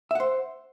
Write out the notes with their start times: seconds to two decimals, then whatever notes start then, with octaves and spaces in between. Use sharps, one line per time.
0.11 E5
0.15 F#5
0.20 C5